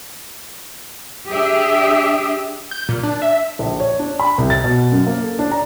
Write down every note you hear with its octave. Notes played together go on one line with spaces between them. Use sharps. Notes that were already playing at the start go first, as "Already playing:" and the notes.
D4 G4 G#4 E5
G6
A#2
D4
E5
A#1
C#5
D4
B5
C2
A6
B2
F#2
A#3
A4
D4
A#5